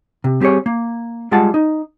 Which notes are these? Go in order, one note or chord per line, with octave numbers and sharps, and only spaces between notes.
C3
G3 C4 G4 G#4 C#5
A#3
G3 G#3 F4 G#4 F#5 A5
D#4